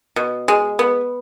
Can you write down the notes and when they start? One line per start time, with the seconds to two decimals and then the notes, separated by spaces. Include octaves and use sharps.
0.16 B2
0.48 G#3
0.79 B3